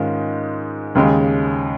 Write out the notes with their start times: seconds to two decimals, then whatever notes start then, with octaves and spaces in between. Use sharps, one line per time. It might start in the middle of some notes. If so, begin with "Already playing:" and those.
Already playing: G#2 D#3 G#3 C#4 F4
0.95 D#2 C#3 G#3